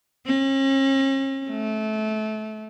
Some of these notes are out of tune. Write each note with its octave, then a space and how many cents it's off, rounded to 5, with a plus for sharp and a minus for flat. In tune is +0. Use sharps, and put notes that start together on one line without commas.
C#4 -45
A3 -25